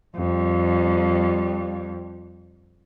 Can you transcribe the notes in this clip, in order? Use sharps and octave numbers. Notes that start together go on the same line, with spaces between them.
F2 G3